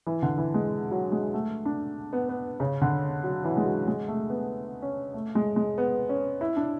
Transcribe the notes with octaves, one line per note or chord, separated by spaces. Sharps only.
E3
D3
E3
G#3
F#3
G#3
A3
D4
B3
B3
C#3
D3
F#3
E3
G#3
F#3
G#3
A3
B3
C#4
A3
G#3
G#3
B3
C#4
E4
D4